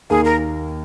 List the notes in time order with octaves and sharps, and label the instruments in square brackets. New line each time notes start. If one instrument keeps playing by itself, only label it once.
[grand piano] D#2 D#3 A#3 [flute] G#4
[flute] A#4